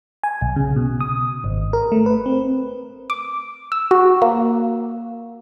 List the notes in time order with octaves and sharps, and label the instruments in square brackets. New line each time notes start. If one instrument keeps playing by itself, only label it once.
[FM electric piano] G#5
B1
C#3
B2
D#6
G#1
A#4
A3
B4
C4
[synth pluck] D6
E6
F#4
A#3